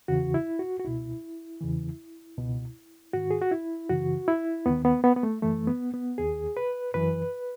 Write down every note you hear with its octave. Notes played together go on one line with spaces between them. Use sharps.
E2 C#3 E3 F#4
E4
F#4
F#4
C#2 B2 E4
E2 C#3 E3
C#2 B2
G#2 D#3 F#4
G#4
F#4
E4
F#2 C#3 E3 F#4
E4
D#2 D#3 B3
B3
B3
B3
A3
F#2 E3 A3
B3
B3
D#2 D#3 G#4
B4
F#2 E3 B4